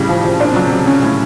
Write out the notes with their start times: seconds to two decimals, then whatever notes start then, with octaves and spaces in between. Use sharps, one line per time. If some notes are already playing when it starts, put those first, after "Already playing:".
Already playing: A2 C#3 G3
0.09 F3
0.25 F3
0.40 A#2 D4
0.52 C#3 F#3
0.64 C3
0.72 F#3
0.87 C#3 C#4
1.03 A2